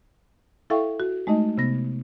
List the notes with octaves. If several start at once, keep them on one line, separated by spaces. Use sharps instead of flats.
E4 A4 E5 F5 G5 C#6
F#4
G#3 A3 D#4 D#5
C3 B3 A#6